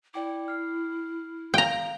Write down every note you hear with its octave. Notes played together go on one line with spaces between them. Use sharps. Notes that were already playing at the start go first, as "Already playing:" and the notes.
E4 D5 G5 D6
F6 C7
F5 G5 A#5